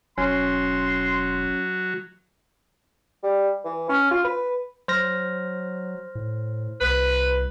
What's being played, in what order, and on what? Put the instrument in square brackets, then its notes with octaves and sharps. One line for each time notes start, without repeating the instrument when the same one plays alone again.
[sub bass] E1 [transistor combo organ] F#3 [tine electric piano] C#4 [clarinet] C6
[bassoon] G3
E3
C#4
F4
B4
[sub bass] F#3 [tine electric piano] C5 F6 A#6
[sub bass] A2
[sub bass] C2 [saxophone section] B4